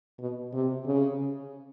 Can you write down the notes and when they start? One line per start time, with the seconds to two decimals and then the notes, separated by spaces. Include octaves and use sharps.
0.19 B2
0.53 C3
0.86 C#3